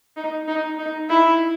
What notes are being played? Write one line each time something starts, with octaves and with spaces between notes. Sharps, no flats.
D#4
D#4
D#4
E4